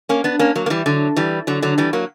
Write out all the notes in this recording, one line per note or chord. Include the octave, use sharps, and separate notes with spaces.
A#3 C#4
B3 D4
A#3 C#4
F#3 A#3
A#3
E3 G3
D3 F#3
E3 G3
D3 F#3
D3 F#3
E3 G3
F#3 A#3